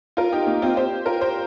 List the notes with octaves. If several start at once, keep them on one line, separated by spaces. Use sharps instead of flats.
F4 A#4
D#4 G4
A#3 D#4
C4 F4
G4 C5
F4 A#4
G4 C5